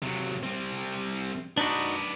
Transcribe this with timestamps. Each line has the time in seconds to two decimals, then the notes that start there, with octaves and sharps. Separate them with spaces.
0.03 C3 F#3
0.43 G3 C4
1.58 D4 D#4 F#4 B4 D5